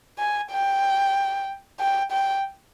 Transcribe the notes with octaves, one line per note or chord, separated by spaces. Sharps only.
G#5
G5
G5
G5